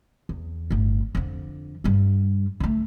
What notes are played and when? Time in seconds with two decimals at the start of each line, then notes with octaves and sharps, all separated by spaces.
0.29 E2
0.71 G1 A2
1.15 F2 D3
1.84 G2 G3
2.60 D3 A3